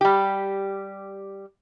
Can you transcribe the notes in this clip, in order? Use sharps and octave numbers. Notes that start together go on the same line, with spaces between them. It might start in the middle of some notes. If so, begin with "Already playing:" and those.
G3 G4